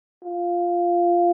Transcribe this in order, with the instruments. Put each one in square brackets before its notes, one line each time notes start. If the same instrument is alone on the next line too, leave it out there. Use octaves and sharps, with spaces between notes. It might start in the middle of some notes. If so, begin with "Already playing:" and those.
[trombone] F4